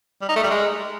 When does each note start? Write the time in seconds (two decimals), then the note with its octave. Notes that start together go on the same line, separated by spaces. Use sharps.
0.22 G3
0.29 D#4
0.36 A3
0.43 G3
0.50 G#3